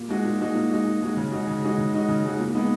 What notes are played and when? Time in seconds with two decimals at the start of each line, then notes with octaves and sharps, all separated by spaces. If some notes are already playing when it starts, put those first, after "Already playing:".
Already playing: A#2
0.09 G#3 D#4 F#4
0.24 A#2
0.40 G#3 D#4 F#4
0.55 A#2
0.71 G#3 D#4 F#4
0.85 A#2
1.01 G#3 D#4 F#4
1.17 C#3
1.32 G#3 D#4 F#4
1.47 C#3
1.62 G#3 D#4 F#4
1.78 C#3
1.93 G#3 D#4 F#4
2.08 C#3
2.24 G#3 D#4 F#4
2.40 A#2
2.54 G#3 B3 D#4